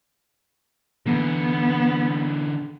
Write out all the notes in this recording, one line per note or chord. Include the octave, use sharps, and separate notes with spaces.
D3 E3 B3